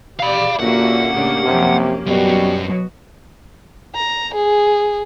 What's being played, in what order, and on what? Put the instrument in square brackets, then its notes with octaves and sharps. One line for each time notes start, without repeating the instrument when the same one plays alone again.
[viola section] G4 D5 [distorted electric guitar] F5 B5
[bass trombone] A#2 [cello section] D3 F#4 E5 [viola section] A#3 C#4 G4 [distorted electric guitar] F#5
[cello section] A2 C#3 D4
[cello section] F#2 F3 [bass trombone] C3
[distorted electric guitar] F#2 [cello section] B2 F#4 [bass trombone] G3
[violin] A#5
G#4